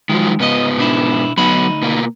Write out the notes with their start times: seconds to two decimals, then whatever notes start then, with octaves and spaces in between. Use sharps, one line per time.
0.09 D#3 F3 F#3 G#3
0.40 C#2 G#2 B3 D#5
0.78 B2 D4 E4
1.38 D2 F#3 B3 D#4 B5
1.82 B2 A#3